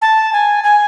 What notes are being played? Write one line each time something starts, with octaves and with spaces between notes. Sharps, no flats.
A5
G#5
G#5